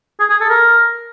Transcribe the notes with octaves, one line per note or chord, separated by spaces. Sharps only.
G#4
G#4
A4
A#4